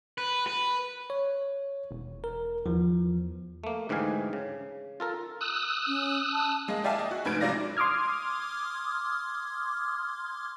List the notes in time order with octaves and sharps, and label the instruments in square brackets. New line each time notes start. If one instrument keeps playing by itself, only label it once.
[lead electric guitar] B4
B4
[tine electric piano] C#5
[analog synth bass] E1
[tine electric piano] A#4
[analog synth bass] E2 [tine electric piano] F3
[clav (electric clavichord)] A3 A#3
D2 G#2 E3 G4 F5 G#5
C#3
F4 A4 A#4
[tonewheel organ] D#6 E6 F#6
[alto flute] C#4
A5
[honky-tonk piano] G#3 A#3 D#5
G4 D5 E5 F5 G#5 A5
D#5
F#4
F1 D2 G#2 B4 G#6 D7
G#2 C3 F#3 D5 F5 A#6
[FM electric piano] C6 D6 D#6 F6 G#6